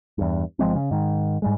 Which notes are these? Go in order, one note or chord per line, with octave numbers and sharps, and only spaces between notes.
E2 G2
G1 F3 G#3 C4
C#3
G#2 D#3
G#2 G3 G#3